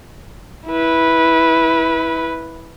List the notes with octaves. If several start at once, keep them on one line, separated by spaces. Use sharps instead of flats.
E4 B4